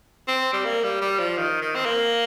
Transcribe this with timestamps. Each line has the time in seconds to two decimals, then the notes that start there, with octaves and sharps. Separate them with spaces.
0.28 C4
0.53 G3
0.65 A#3
0.83 G3
1.01 G3
1.19 F3
1.38 D#3
1.62 D#3
1.75 C4
1.86 A#3